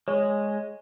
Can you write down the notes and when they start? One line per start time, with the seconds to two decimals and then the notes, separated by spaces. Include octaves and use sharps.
0.08 G#3 C#5